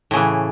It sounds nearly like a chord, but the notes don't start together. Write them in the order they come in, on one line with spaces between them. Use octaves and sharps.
A2 C#3 E3